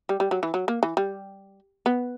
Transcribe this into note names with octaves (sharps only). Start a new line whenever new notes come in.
G3
G3
F#3
E3
F#3
A#3
E3
G3
B3